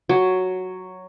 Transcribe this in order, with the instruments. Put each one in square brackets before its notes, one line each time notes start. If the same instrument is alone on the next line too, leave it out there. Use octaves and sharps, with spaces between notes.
[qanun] F#3